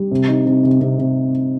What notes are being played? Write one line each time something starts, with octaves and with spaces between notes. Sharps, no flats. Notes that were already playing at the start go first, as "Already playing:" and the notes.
Already playing: G3
C3
D#4
C3
C3
C3
C3